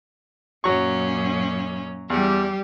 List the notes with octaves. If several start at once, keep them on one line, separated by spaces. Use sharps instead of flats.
F#2 A#2 F#3 C#4 C#6
E2 G3 G4